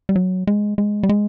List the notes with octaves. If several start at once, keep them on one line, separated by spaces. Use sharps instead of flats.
G3
F#3
G#3
G#3
G3
G#3